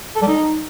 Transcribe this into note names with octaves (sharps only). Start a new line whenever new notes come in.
A4
G3
D#4